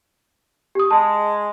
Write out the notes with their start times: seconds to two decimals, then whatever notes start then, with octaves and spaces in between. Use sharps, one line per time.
0.75 G4 D#6
0.91 G#3 A5